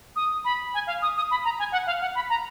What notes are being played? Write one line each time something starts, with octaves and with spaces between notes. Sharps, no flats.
D#6
B5
G#5
F5
D#6
D#6
B5
A#5
G#5
F#5
F5
F#5
B5
A#5